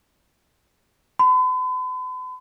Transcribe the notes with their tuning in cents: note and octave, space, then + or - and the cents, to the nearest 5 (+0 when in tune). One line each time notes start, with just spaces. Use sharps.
B5 +45